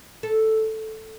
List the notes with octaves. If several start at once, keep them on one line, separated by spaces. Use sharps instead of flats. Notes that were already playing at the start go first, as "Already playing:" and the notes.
A4